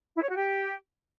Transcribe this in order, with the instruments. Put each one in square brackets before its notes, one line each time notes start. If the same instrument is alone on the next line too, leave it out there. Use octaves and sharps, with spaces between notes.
[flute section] E4
C#5
F#4
G4